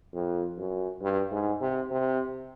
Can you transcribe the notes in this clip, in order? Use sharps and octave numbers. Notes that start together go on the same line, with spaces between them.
F2
F#2
G2
G#2
C3
C3